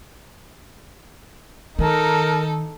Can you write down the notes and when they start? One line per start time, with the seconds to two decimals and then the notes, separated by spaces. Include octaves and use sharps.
1.79 D#3 D#4 A4 A#4